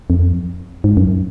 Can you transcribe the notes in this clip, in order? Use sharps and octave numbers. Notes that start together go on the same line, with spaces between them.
F2
G#2
F#2